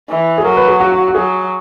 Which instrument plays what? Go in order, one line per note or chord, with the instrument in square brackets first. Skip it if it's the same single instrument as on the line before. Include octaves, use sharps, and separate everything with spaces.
[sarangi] E3
[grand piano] G#4
[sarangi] F#3 [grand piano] A#4
[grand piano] B4
G#4
F#4
F#4
F#4
[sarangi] F#3 [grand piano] G#4